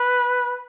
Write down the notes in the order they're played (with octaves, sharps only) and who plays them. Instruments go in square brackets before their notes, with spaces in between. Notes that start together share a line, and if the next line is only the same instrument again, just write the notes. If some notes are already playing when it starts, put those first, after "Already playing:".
Already playing: [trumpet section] B4